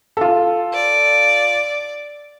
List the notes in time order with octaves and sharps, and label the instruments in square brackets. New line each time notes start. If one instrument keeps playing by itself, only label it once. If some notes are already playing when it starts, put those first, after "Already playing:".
[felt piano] F4 A4
[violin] D5